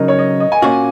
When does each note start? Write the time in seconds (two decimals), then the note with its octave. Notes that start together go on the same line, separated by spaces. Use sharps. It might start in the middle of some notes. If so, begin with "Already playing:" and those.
Already playing: C#3 F#3 D#4 A#4
0.08 C#5
0.19 D#5
0.40 D#5
0.52 G#5
0.62 A#2 A#3 C#4 F#4